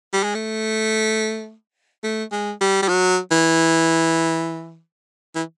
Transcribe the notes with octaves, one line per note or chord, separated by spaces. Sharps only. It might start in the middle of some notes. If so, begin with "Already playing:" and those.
G3
G#3
A3
A3
G#3
G3
G3
F#3
E3
E3